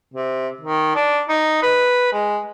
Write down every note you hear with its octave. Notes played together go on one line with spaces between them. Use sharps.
C3
D#3
D4
D#4
B4
G#3